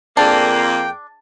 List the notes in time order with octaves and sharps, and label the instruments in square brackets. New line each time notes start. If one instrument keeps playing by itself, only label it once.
[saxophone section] F2 A#3 [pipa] D4 [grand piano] G#4 D5 A5 [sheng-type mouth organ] G5